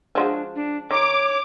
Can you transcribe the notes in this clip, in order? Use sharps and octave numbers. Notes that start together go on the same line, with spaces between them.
F3 G#3 D4 F#4
D4
D#3 C#5 D6